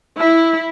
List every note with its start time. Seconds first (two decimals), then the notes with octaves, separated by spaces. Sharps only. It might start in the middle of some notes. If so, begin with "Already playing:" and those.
0.17 E4